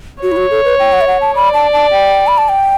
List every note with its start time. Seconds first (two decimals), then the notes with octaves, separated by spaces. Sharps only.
0.22 F#4 C#5
0.32 E4
0.37 F#4
0.51 A4
0.65 B4
0.79 G5
0.93 F#5
1.01 E5
1.07 F#5
1.21 A5
1.35 D5 B5
1.54 A5
1.73 A5
1.91 G5
2.27 B5
2.38 A5
2.49 G5